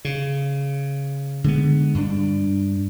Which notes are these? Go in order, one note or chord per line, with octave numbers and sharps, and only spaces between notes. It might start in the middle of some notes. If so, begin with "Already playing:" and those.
C#3
D3 G#3 B3
G2 D4